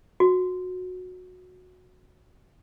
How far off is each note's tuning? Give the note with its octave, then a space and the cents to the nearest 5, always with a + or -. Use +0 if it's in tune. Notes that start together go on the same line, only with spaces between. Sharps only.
F#4 -15